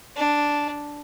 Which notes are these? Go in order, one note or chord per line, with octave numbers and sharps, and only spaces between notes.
D4